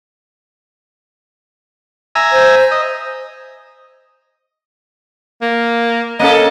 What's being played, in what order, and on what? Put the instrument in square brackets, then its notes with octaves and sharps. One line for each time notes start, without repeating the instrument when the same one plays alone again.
[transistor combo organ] E5 G#5 A#5
[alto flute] C5
[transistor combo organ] D#5
[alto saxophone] A#3
[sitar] A#3 C#4 A4 [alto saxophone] D#5